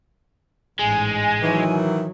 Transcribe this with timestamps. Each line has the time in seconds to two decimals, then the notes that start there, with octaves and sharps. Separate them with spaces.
0.79 A1 G#2 G#3 G#5
1.42 D#3 E3 F#3